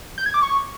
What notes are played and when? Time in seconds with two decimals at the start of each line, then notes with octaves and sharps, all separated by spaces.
0.18 G6
0.26 G#6
0.34 D6
0.42 C#6